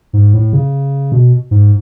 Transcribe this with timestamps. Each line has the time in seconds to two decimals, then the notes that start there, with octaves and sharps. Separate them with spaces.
0.13 G#2
0.34 A2
0.53 C#3
1.12 B2
1.51 G#2